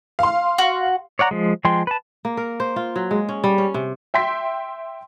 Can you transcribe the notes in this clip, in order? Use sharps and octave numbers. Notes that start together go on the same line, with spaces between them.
F5 C6
F#4
C#5 D5 F#5 A#5
F3 G#3
F3 G#3 G5 C6
B4 A5
A#3
A#4
C5
F4
F#3
G#3
C#4
G3
C#4
C3
E5 G5 C6 B6